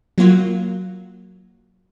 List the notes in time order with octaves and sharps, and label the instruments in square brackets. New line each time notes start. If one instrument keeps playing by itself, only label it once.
[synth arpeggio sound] F#3 A#3 F4 F#4